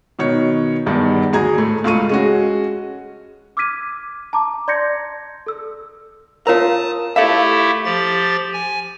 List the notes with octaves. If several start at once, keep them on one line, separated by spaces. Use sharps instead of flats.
B2 D#3 C#5
E2 G2 D#3
D2 G#4 A#5 G#6
A2 A3
C#2 A3 F4 C#6 D#7
G#3 C#4 F#4
D6 E6 F6 G#6 B6 D#7
A5 A#5 D6
D5 C6 G6 G#6 A#6 C#7
A4 E6
F4 A#4 C#5 F5 A5 A#5 D#6
A3 E4 G4 A4 C#5 E5 F5
F3 G4 A6
G#5